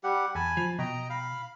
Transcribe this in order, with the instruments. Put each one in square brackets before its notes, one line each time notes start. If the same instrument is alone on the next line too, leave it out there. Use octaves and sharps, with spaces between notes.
[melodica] G3 G4 F#5
[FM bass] E2 [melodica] G#5 A5 B5
[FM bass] F3
[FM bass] B2 [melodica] D#5 G5 A#5
[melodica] F5 B5